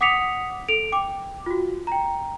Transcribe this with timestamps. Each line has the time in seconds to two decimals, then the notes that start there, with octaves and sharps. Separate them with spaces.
0.01 F#5 D6 D#6 B6 C#7 F7
0.69 A4 D7 F7
0.92 G5 D6
1.46 F4 F#4
1.87 G5 A#5